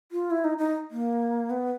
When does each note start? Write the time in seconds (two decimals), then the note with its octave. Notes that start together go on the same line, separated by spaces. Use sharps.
0.12 F4
0.31 E4
0.44 D#4
0.58 D#4
0.91 A#3
1.50 B3